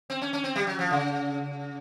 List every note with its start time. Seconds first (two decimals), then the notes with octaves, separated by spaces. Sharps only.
0.10 C4
0.22 C#4
0.33 C#4
0.44 C4
0.56 G3
0.67 F#3
0.79 F3
0.91 C#3